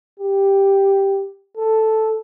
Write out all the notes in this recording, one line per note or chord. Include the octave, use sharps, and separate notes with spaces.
G4
A4